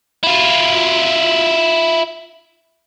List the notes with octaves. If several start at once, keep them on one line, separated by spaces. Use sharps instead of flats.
E4 F4